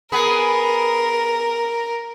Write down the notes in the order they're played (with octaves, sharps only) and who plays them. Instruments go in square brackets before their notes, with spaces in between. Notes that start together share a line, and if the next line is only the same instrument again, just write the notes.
[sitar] B3 G#4 B4 [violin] A#4